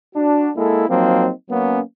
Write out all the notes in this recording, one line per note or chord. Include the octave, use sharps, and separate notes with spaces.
D4 F#4
G#3 A#3 E4 A4
F3 F#3 A#3 C4 D#4
F#3 A#3 B3 C#4